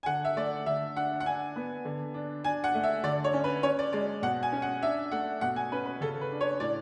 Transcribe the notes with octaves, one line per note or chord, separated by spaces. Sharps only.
G#5
D3 F#5
E5
A3 D5
D3 E5
D4 F#5
F#5
D4 G#5
B3
D3
D4
D4 G#5
F#5
A3
E5
D3 D5
C#5
C#4
B4
C#4 C#5
D5
G#3 D5
B2 F#5
G#5
C#4
F#5
D4 E5
A3 F#5
B2 F#5
G#5
C#4 B4
B4
C#3 A4
B4
D4
C#5
A2 D5